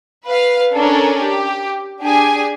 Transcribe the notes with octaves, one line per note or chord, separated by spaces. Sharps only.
B4 F5
C#4 D4 A4 A#4
G4
D4 G4 G#4 G#5